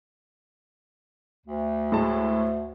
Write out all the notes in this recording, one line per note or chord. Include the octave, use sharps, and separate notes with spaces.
D2
A2 G#3 A5